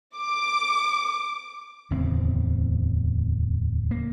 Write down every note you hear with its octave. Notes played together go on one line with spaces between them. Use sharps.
D6
D1 E2 C#3 C4
A#3